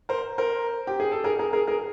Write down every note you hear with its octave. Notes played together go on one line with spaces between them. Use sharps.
A#4 C5
A#4 C5
G4
G#4
A4
G#4 A#4
G#4 A#4
G#4 A#4
G#4 A#4